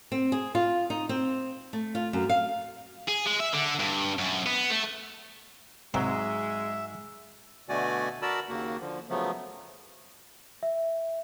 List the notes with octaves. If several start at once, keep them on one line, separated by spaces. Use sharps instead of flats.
C4
G#4
F4
D#4
C4
A3
F4
F#2
F5
G#4
G#3
E5
D3
G2
F#2
B3
A3
G#2 C3 F#3 G#3 C4 C5 E5
B2 D3 A3 F#4 D5 G#5
F#4 A#4 D5 A5 B5 E6
D#2 C#3 A#3 F#4
D3 F3
C#3 F3 F#3 A3 B3
E5